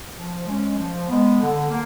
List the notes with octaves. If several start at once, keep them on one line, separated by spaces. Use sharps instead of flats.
F3
G#3 C#4
F3
G#3 B3
D3
A#3